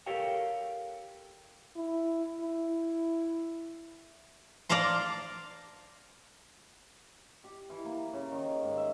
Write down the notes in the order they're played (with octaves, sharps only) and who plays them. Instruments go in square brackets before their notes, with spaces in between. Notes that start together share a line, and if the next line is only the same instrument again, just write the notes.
[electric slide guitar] G4 A4 A#4 C#5 F5 G5
[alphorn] E4
E4
[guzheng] D5 F5 A5 A#5 C6
[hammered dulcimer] G4
E3
A#3
C#3
D#3
G#2
E5